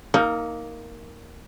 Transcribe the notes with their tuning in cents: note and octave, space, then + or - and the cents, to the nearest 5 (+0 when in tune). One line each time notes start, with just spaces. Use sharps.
A#3 +0 D#4 +20 A#4 -35